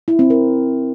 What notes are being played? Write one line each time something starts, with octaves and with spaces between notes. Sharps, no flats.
E4
C4
A#4